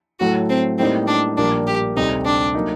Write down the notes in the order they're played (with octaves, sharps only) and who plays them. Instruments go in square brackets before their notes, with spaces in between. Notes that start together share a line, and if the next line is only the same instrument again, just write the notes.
[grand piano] A2 F#3 A3 [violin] F#4
[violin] C4
[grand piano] A2 G3 A#3 D#4 [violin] C4
[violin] D4
[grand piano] A#1 A#2 G3 A#3 [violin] D4
[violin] G4
[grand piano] D2 C3 G3 C4 [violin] D#4
[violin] D4
[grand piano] F#3 A#3 D#4